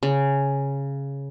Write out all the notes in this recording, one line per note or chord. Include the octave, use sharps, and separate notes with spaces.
C#3